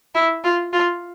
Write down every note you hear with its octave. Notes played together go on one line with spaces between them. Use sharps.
E4
F4
F4